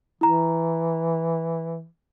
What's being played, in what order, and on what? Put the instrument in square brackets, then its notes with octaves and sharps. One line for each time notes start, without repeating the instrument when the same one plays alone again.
[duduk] E3 [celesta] E4 A#5